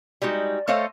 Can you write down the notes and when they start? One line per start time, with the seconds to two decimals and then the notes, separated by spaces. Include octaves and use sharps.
0.22 G3 G#3 D#4 F#4
0.68 A3 A4 C5 C#5 D#5 F5